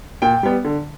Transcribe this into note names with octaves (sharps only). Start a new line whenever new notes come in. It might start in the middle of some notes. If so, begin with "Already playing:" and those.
A#2 G5
G3 B3
D3